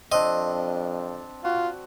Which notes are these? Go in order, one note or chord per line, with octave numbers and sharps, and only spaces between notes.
F2 C4 D4 D#5
F4 F#4